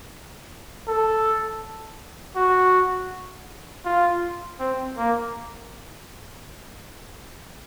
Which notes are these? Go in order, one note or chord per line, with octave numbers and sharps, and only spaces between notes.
A4
F#4
F4
C4
A#3